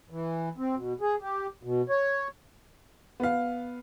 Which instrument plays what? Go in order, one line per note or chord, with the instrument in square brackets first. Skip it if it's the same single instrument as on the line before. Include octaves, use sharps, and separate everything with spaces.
[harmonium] E3
C4
B2
G#4
G4
B2
C#5
[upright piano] B3 F5